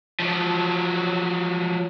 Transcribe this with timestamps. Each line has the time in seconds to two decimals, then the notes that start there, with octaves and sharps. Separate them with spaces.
0.20 F3 F#3